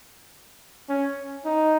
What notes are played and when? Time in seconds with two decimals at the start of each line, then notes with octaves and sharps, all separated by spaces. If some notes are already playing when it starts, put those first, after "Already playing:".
0.89 C#4
1.46 D#4